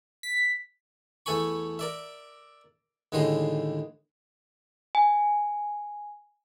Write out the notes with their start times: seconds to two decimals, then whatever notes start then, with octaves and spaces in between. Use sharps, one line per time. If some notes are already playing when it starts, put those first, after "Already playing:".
0.23 B6
1.26 E2 A3 A4 G#5 B5 C#6
1.79 A#4 D5 E5
3.12 D#2 A2 D3 G#3 C5 D#5
4.95 G#5